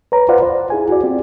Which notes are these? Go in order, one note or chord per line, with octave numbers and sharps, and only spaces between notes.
B4 C#5 A#5
F4 B4 C5 D5 F5 F#5
C5
E4 G#4 G#5
F#4 D5
C4 F4 G4